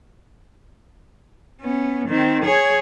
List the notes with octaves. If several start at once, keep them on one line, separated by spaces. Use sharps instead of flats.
B3 C#4
D#3 C4
G#4 C#5